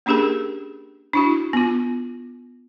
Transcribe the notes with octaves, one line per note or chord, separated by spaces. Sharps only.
A#3 C#4 D4 G4 G#4 A#4
D4 E4 F#4
B3 F4